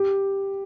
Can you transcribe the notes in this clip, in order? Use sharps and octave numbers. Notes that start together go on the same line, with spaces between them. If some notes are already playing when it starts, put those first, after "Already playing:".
Already playing: G4